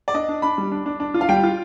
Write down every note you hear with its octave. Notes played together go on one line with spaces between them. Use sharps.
D5
D4 D#5
D4
D4 B5
G3
D4
D4
D4
F4
F5
G3 G5
F4